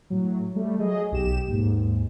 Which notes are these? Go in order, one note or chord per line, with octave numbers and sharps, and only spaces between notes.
A2 F#3
G3 A3
F#3 G#4 D#5
B1 G4 E7
D#2 G#2